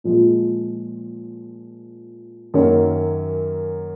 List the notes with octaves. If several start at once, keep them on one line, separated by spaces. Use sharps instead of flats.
A#2 F3 G#3
F#2 D#3 F#3 A#3 C#4